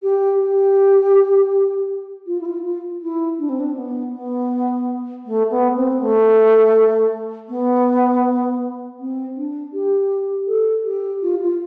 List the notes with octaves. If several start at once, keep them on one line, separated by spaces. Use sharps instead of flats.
G4
G4
F4
E4
F4
F4
E4
D4
C4
D4
B3
B3
A3
B3
C4
A3
B3
C4
D4
G4
A4
G4
F4
F4